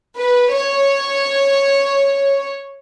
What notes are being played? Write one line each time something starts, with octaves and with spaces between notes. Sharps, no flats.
B4
C#5